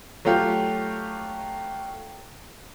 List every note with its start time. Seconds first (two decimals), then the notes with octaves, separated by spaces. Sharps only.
0.25 F#3 A3 F4 G4